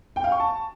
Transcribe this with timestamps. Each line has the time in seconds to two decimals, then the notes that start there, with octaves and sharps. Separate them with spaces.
0.16 G5
0.24 F5
0.32 C#6
0.40 A5